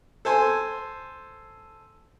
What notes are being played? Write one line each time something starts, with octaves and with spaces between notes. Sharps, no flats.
A4 C5 G#5 C6